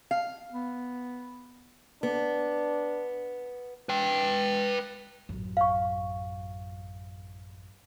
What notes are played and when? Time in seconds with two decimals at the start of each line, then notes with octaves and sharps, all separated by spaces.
0.11 F5
0.52 B3
2.03 B3 D4
3.89 B4 G5
5.29 A1 F#2
5.57 F5 C#6